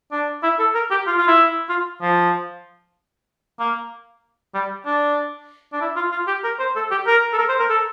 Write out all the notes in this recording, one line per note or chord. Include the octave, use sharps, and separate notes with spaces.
D4
E4
A4
A#4
G4
F4
F4
E4
F4
F3
A#3
G3
D4
D4
E4
F4
F4
G4
A#4
C5
A4
G4
A#4
A4
A#4
C5
A#4
A4